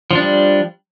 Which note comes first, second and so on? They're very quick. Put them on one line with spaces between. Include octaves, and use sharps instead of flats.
F3 D4 G3